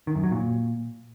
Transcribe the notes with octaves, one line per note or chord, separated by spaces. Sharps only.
D#3
F#2
F#3
A#2